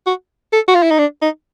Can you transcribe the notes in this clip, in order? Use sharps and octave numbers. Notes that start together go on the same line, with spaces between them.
F#4
A4
F#4
F4
E4
D#4
D4
D#4